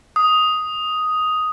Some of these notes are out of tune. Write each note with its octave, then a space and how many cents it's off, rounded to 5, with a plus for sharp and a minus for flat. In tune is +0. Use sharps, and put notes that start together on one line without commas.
D#6 +5